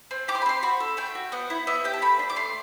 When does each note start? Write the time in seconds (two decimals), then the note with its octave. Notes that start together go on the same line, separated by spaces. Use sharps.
0.11 C4
0.28 G4 D6
0.35 C6
0.42 B5
0.46 C4 C6
0.62 F#4 B5
0.80 A4
0.97 A3 G5
1.15 F#4
1.32 B3 F#5
1.50 E4
1.67 B3 E5
1.84 G4 G5
1.93 A5
2.02 A3 B5
2.19 D4
2.30 D6
2.36 A3 C6